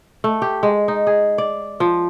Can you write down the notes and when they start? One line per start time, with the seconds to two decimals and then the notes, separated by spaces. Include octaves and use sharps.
0.24 A3
0.42 G4
0.63 G#3
0.88 D#4
1.07 G#4
1.38 D5
1.80 F3